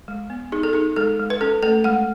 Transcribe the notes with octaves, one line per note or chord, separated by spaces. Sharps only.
G#3
B3
D#4 G#4
A4
D#4 G#4
G#3 A4
G#3
B4
C#4 A4
A3 A4
G#3 F#5